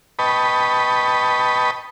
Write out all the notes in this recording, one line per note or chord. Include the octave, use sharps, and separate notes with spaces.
B4 D#5 G5 A5 B5 C#6